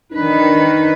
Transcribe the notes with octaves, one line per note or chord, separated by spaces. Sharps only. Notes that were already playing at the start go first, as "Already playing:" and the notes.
D#3 D4 D#4 B4